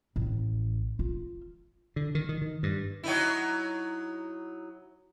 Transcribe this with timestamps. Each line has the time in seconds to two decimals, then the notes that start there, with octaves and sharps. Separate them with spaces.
0.16 A1
0.99 F4
1.96 D3
2.15 D#3
2.29 D#3
2.42 D#3
2.63 G2
3.04 F#3 D#4 E4